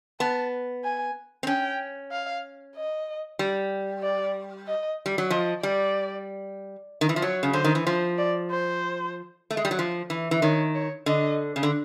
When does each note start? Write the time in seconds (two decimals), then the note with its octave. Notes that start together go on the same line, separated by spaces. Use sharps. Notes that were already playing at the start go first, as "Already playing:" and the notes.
0.20 B3 A5
0.84 G#5
1.43 C4
1.47 C#4 G5
2.11 F5
2.76 D#5
3.39 G3
4.03 D5
4.67 D#5
5.06 G3
5.18 F#3
5.30 F3 D#5
5.63 G3 D5
7.01 D#3
7.09 E3
7.16 F3
7.22 F#3 C#5
7.43 C#3
7.53 D3 C5
7.64 D#3
7.75 E3
7.87 F3 C5
8.18 D5
8.51 C5
9.50 A3
9.57 G#3
9.65 G3
9.71 F#3
9.79 F3
10.10 E3
10.31 E3
10.42 D#3 C#5
10.75 C#5
11.06 D3 D#5
11.56 C#3
11.63 D3